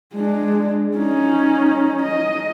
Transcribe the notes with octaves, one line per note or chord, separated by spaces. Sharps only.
G#3 D4
C#4 D#4
D#5